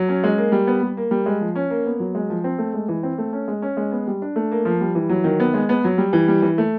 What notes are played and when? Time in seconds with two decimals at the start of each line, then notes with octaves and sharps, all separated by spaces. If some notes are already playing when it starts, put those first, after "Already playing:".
Already playing: F#3
0.09 C#4
0.24 G#3
0.38 A#3
0.52 G3
0.67 B3
0.83 G3
0.97 A#3
1.11 G3
1.26 G#3
1.40 F3
1.55 C#4
1.70 A#3
1.86 B3
1.99 F#3
2.15 G#3
2.29 F3
2.44 C4
2.58 A3
2.74 G#3
2.88 E3
3.03 C4
3.18 A3
3.33 C#4
3.48 G#3
3.62 C#4
3.77 G#3
3.92 B3
4.07 G3
4.22 D4
4.36 A3
4.51 A#3
4.65 F3
4.81 G3
4.95 E3
5.09 F#3
5.24 D#3
5.40 B3
5.54 G#3
5.69 B3
5.84 F#3
5.98 G3
6.13 E3
6.28 G3
6.42 E3
6.58 A3